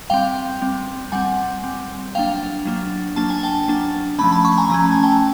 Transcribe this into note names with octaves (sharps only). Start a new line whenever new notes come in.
G3 C4 F5 G5
G3 C4
G3 C4 F#5 G#5
G3 C4
F#3 A#3 D4 F5 G5
F#3 A#3 D4
F#3 A#3 D4 A5
G#5
G5 A5
F#3 A#3 D4
F3 A3 C#4 A5 B5
A5 B5
B5 C#6
G#5 A#5
F3 A3 C#4 A#5
A5
G#5
G5 A5